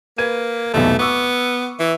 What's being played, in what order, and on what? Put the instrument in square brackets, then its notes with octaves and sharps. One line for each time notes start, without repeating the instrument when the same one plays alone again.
[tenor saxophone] A#3 [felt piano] B4 G#6 D#7
[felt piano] F1 B1 E2 [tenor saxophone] A3
[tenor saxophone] B3 [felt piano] C#6 D6 E6
[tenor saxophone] E3